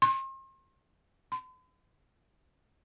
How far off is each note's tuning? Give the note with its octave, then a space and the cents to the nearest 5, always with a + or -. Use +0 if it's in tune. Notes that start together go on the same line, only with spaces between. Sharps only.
C6 +40
C6 -45